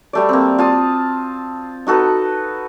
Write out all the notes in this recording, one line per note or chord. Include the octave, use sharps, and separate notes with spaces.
G3 A3 D5
A#3 C4
F4 A5 D#6
D#4 F#4 A4 B4